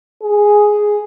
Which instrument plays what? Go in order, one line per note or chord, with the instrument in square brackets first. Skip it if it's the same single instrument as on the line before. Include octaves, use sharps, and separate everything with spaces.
[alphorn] G#4